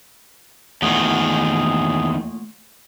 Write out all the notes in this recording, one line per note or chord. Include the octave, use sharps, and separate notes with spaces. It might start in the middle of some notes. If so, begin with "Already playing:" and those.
E2 A#2 D#3 A3 G#4 F#5